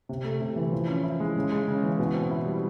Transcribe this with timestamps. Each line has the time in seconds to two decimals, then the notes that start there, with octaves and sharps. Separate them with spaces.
0.09 C3
0.25 A3
0.41 C3
0.56 E3
0.72 F3
0.87 C#4
1.03 E4
1.20 G#3
1.36 C#3
1.52 G#3
1.68 C#3
1.83 E3
1.99 B2
2.14 C4
2.31 E4
2.46 G3